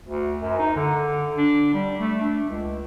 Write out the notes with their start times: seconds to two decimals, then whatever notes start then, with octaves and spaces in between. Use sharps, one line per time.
0.06 D2
0.41 F#2
0.59 D#4
0.76 D3
1.37 D4
1.73 G3
2.00 A3
2.21 D4
2.49 C#2